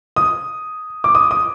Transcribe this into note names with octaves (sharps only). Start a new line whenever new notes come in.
D#6
D6
D#6
D#6